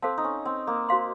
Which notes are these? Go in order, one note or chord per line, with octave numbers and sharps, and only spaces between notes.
C4 A4 C5 F5 A5
D#4
C#4
C4
A#3
F#4 C5 F5 C6